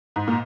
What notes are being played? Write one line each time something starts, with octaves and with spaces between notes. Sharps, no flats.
G#2
A#2